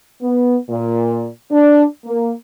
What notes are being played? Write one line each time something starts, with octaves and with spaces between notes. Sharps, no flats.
B3
A#2
D4
A#3